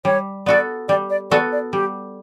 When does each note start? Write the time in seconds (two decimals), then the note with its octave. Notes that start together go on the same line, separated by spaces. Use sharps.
0.05 G3 C#5
0.46 B3 F#4 A4 D5
0.88 G3 D5
1.10 D5
1.31 B3 F#4 A4 D5
1.52 D5
1.73 G3 G4